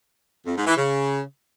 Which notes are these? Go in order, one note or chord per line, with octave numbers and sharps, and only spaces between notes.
F2
G#2
E3
C#3